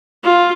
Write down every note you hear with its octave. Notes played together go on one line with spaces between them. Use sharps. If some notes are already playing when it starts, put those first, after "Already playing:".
F4